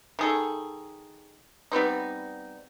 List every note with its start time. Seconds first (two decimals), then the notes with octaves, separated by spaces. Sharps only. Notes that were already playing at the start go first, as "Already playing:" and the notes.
0.19 D#3 G#4 A4
1.72 G3 B3 C4 D#4